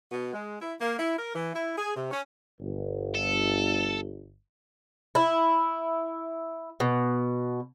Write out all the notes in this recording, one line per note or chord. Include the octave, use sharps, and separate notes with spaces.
B2
G#3
E4
A#3
E4
A#4
E3
E4
G#4
C3
C#4
G1
A4
E4
B2